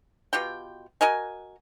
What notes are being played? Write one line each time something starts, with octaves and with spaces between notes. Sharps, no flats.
B2 F4 G4 G5
F#4 A#4 D#5 G#5